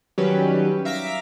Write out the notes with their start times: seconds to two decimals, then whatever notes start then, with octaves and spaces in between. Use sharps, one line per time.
0.18 D#3 F#3 G3 C#4 G4 B4
0.85 E5 F5 A#5 D6 B6